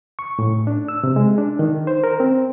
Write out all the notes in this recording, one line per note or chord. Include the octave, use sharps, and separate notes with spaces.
C#6
A2
D4
E6
C3
G#3
D4
D#3
C5
A#4
C4